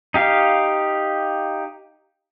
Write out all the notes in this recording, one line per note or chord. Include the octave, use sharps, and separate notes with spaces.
D#4 G4 F5